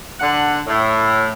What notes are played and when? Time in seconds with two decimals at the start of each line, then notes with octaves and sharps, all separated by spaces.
0.20 D3 F#5
0.66 A2